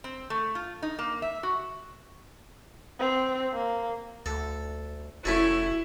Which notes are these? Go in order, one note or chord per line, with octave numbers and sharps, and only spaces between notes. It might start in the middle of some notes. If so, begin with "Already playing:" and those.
C4
A3
F4
D#4
A#3
E5
F#4
C4
A#3
D2 A4
F1 A3 C#4 E4 F#4 A4